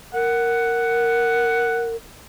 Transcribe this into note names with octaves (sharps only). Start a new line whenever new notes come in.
A#4 F#5